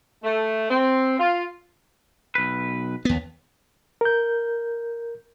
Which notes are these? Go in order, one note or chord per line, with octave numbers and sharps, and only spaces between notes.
A3
C4
F4
B1 B4
D#2 B3
A#4 G6